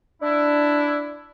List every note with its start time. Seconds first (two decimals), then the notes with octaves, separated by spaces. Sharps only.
0.22 D4 E4